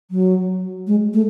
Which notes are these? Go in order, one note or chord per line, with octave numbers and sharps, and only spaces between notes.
F#3
G#3
A3